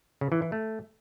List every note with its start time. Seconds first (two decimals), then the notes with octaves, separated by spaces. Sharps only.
0.21 C#3
0.32 E3
0.42 E3
0.52 A3